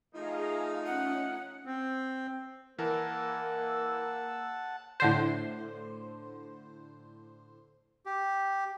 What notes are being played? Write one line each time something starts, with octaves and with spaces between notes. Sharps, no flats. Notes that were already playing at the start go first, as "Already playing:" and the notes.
F3 A3 D#4 G#4 F5 A#5
C#4 F#5
C4
E3 A#3 A#4 F#5 A5 E6
A2 D3 C5
G4